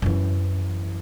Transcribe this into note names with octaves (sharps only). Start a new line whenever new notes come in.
F#2 E3